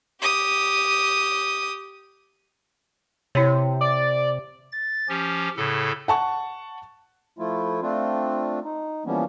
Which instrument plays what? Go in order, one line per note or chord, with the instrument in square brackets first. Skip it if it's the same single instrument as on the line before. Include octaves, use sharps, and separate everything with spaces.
[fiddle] G4 D#6
[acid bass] C3 [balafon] E4 C#5
[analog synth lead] D5
[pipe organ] A6
F3 C#4 G4
A2 C#3 A4
[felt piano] F#5 A5 C#6
[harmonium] F3 A3 E4 F4
A3 C4 D4 F4
D#4
E3 F3 G3 A#3 B3 C#4